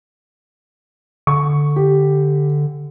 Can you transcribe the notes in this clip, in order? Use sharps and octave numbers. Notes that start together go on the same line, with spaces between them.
D3 C#6
G4